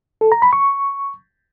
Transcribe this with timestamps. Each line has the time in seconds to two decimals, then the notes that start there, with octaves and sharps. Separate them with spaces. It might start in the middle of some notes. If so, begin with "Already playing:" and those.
0.21 A4
0.32 A#5
0.42 B5
0.53 C#6